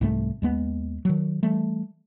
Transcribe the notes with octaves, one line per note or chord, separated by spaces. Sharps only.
C2 G#2 A3 C4
D#2 G#3 B3
D#3 F#3
E3 G3 A3